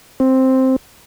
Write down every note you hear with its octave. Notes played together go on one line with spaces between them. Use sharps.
C4